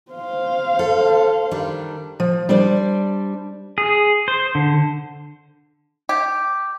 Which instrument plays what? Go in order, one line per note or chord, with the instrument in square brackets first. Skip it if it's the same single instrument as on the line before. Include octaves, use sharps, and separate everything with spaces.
[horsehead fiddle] C5 F5
[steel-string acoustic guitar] A4
D#3 G3 D4
F3
G3 D4 C5 D5
[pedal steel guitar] G#4
C5
D3
[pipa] G4